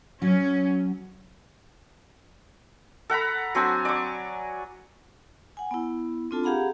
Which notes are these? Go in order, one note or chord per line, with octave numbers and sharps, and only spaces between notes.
F#3 C#4
A4 F#5 A#5 B5
F#3 C4 D4 G#5
D5 C#6
F#5 G#5
B3 E4
C4 D4 F4 A4 A5
G4 G#4 F5 F#5 A#5 B5